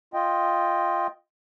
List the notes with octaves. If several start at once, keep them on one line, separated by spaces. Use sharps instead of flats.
F4 D#5 G5